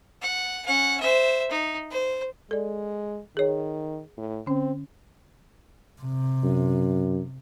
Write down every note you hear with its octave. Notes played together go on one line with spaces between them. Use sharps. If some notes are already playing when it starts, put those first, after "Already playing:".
F#5
C#4 F#5
C5 E5
D#4
C5
G#3 A4 D5
D#3 G#4 C#5
A2
D3 C4 C#4
C3
F#2